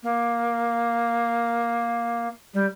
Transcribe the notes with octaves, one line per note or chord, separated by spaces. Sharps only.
A#3
G3